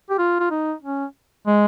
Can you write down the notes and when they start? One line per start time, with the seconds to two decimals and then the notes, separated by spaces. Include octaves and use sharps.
0.10 G4
0.19 F4
0.40 F4
0.51 D#4
0.83 C#4
1.47 G#3